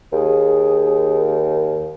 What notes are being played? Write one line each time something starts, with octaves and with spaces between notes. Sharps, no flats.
D#2 G#4